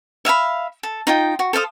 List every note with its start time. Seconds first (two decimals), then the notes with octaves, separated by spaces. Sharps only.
0.25 E5 F5 G#5 B5
0.83 A4
1.07 D#4 F4 G5
1.39 F#4
1.53 A4 C5 F5 D#6